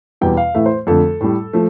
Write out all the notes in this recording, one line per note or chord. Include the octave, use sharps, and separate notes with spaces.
E2 B2 G3 G5
F5
A2 E3 A3 E5
C5
F2 D3 A3 A4
A2 G3
F3 A3